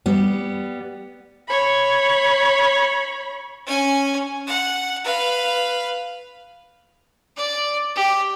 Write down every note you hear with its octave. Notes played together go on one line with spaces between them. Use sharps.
G3 B3
C#5 B5
C#4 G#5
F#5
B4 F5
D5
G4